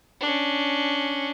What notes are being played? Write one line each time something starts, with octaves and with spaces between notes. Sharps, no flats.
C#4 D4